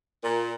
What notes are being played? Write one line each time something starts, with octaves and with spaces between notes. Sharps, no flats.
A#2